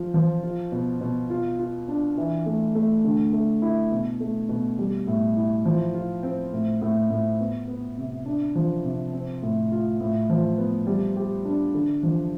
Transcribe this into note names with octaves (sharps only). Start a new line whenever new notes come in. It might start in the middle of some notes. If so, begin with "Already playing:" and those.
Already playing: F3 F4
F3
F4
B2
B2
F4
F4
D4
E3
A3
A3
D3
A3
E4
B2
A3
B2
G3
A2
E4
F3
F4
C4
A2
A2
A2
B3
B3
C3
D4
F3
C3
C4
A2
F4
A2
F3
B3
G3
G4
D4
D3
F3